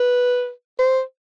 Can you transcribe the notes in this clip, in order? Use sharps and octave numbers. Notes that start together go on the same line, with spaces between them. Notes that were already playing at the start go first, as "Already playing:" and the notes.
Already playing: B4
C5